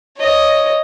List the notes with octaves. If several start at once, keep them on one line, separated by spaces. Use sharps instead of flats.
C#5 D#5